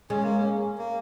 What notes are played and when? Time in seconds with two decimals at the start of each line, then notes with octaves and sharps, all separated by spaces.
0.10 G#3 C#4
0.23 A#3
0.37 C#4
0.78 A#3